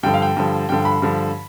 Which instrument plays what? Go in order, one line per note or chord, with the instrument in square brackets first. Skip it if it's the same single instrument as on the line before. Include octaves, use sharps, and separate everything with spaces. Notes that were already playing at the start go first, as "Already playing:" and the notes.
[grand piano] G2 D3 F3 G5
F5
G5
G2 D3 F3
G2 D3 F3 G5
B5
G2 D3 F3